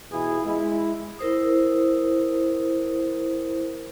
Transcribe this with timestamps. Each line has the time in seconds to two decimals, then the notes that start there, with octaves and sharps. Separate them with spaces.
0.11 B2 E3 E4 F4 G#4
0.44 G#3 E4
1.19 E4 A#4 C5 D#6